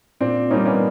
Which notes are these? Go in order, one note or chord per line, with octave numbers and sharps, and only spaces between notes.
A#2 C4 D4
G3 A#3 C#4 D#4
B3 C#4